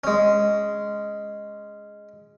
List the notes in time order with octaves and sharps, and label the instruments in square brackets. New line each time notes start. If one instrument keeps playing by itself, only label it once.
[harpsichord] G#3 C#4